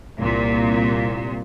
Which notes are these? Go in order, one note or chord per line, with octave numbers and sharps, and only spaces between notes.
C2 A#2